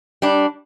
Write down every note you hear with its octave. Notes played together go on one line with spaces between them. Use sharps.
G3 D4